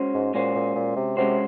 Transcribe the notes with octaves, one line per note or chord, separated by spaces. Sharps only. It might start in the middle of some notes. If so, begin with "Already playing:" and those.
Already playing: G#3 C#4 F#4 C5
G#2
A#2 G#3 C#4 F#4 C5
A#2
A#2
C3
C3 G#3 C#4 F#4 C5